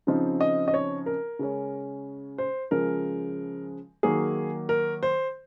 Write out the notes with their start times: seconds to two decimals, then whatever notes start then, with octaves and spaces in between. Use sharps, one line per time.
0.07 C#3 F3 C4 D#4
0.41 D#5
0.68 D#5
0.74 C#5
1.06 A#4
1.39 C#3 G#3 C#4
2.38 C5
2.71 C#3 F3 G#3 A#4
4.03 D#3 F#3 A#3 G#4
4.69 A#4
5.03 C5